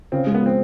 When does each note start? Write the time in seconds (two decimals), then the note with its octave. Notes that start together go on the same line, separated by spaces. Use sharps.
0.12 C#3 C4
0.26 G#3
0.34 B3
0.42 F3 C4